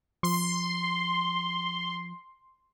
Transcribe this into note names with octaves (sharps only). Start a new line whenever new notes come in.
F3 C6